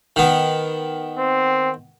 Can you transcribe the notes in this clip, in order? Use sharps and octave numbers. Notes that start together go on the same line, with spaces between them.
D#3 B3
C4